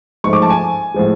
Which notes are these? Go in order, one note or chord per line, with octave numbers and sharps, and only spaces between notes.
G#2 F3 A3 C#6
D6
A5
G#5
A2 F3 G#3